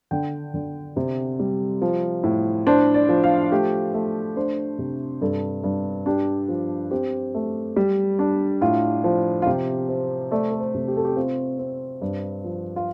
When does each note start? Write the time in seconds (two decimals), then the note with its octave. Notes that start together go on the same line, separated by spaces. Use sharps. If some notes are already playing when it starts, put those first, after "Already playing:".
0.11 D3 G5
0.54 D3
0.96 C3 C5
1.39 G3
1.82 F3
2.23 A2
2.67 D4 C5
2.94 D5
3.09 F3
3.24 F5
3.52 A3 G4
3.94 A3
4.36 D4 C5
4.79 C3
5.21 G2 A4
5.64 G2
6.06 D4 G4
6.48 F3
6.91 C4 G4
7.34 A3
7.76 G3
8.19 D4
8.61 A2 F4
9.04 F3
9.42 F4
9.46 C3 G4
9.89 C4
10.31 A3 D5
10.51 A4
10.61 C5
10.74 C3
10.88 G4
10.97 A4
11.05 G4
11.16 C4 F4
11.59 C4
12.02 G2
12.44 F3
12.76 F4